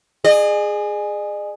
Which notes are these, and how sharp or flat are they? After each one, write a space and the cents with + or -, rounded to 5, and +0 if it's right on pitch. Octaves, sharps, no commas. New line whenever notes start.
G#4 +0 D#5 -45